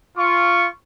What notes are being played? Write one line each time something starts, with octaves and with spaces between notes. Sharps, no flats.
F4 C#6